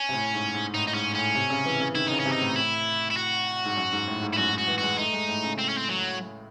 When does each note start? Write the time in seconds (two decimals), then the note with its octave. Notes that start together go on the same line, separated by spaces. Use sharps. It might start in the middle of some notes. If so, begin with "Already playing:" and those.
Already playing: C#4
0.09 C3
0.13 A2
0.34 G#2
0.54 G#2
0.74 A2 D#4
0.87 D#4
0.94 G#2 C#4
1.15 A2 C#4
1.35 C3
1.50 C#3
1.65 E3
1.80 C#3
1.95 D#3 E4
2.07 C#3 D#4
2.19 C#4
2.25 C3
2.32 D#4
2.41 A2
2.56 E4
3.11 E4
3.17 F#4
3.65 G#2
3.77 F#2
3.92 G#2
4.08 A2
4.22 G#2
4.33 E4
4.38 F#2 F#4
4.53 G#2
4.58 F#4
4.67 E3
4.78 G#3 F#4
4.98 A3 D#4
5.13 G#3
5.29 A2
5.44 C#3
5.58 C4
5.68 C#4
5.77 C4
5.89 F#3